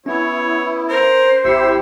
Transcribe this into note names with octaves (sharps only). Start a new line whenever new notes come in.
B3 C#4 E4 C#5
A#4 C5
G#1 C4 E4 G4 E5 C7 C#7